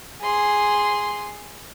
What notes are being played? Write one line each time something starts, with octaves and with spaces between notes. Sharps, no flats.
G#4 C6